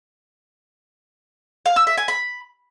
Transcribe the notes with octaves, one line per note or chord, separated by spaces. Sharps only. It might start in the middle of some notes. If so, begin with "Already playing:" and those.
F5
E6
E5
G#5
B5